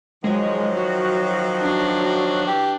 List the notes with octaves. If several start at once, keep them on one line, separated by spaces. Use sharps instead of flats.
D#3 F3 F#3 G#3
F#4
D4
E3 G4